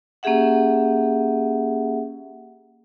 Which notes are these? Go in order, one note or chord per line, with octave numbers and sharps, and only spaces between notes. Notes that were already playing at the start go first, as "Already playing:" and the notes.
A#3 C#4 G4 G#4 E5 F#5